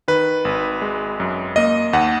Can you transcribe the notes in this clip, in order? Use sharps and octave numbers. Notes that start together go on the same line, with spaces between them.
D#3 B4
G#1
G#3
F#2
A#3 D#5
D#2 F#5